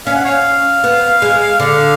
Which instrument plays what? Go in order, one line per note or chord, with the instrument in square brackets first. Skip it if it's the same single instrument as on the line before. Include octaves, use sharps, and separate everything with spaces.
[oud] C#4 [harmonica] F5
[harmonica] F#5
C#5 F5
[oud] B3
G#3
[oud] D3 [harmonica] F5